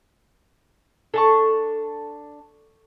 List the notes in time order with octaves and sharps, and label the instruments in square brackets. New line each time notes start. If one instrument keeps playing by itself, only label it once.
[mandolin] D4 A5 C#6 [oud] A4